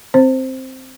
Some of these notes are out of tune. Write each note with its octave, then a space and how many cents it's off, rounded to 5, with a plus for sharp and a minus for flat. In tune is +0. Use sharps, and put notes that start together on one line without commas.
C4 +0 C5 +0